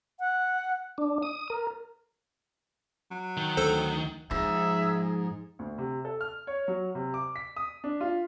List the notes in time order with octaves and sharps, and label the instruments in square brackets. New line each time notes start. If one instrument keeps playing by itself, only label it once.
[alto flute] F#5
[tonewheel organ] D4
D#6
A#4
[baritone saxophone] F#3
[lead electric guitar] D#3
[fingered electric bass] D2 [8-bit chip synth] A4 C5
[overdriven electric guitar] G#2 [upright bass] F3 [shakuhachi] G#4 [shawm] E5
[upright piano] D2
C3
A4
F6
C#5
F#3
C3
D6
B6
D#6
D4
F4